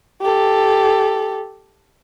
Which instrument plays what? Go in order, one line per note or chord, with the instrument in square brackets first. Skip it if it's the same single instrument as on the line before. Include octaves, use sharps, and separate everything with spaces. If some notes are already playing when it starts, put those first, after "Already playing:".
[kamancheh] G4 A4